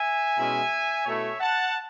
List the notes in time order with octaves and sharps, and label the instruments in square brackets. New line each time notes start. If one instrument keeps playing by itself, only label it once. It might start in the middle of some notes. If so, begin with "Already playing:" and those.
Already playing: [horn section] E5 G#5
B2 G#3 C#4 E4
B2 A3 E4 C#5 E5
F#5 A5